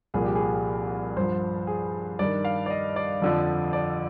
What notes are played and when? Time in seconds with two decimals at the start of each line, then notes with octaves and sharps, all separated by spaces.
0.14 C2 A#2 F3 G#4
0.25 G4
0.35 G#4
1.17 G2 F3 C5
1.67 G#4
2.19 G2 D#3 D5
2.45 F5
2.66 D5
2.70 D#5
2.96 D5
3.22 F2 D3 F3
3.73 D5